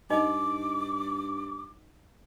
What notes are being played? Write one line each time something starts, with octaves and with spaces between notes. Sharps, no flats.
G2 D#4 D#5 D6